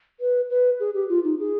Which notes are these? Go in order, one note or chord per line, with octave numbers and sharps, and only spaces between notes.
B4
B4
G#4
G4
F4
D#4
G#4